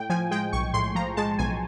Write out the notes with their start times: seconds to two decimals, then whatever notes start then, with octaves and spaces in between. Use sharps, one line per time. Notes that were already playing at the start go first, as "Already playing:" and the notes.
Already playing: A2 G5
0.10 F3 G#5
0.31 G#3 G5
0.53 B1 C#6
0.74 A2 C6
0.95 F3 A#5
1.17 G#3 A5
1.39 B1 G#5